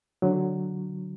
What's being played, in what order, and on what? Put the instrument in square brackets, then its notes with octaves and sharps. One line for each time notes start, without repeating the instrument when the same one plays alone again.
[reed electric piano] D3 F#3